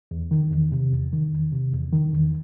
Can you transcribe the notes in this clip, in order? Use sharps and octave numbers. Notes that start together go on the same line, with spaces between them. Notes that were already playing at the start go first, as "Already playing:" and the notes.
E2
D#3
E2
C3
E2
D#3
E2
C3
E2
D#3
E2